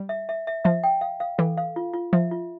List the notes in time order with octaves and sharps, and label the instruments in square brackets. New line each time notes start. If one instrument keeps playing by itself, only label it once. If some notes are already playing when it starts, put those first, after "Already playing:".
Already playing: [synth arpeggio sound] G3
[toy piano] E5
E5
E5
[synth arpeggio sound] F3 [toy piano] E5
[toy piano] G5
F5
F5
[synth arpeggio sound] E3 [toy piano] A4
[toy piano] F5
F4
F4
[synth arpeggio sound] F3 [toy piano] E5
[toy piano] F4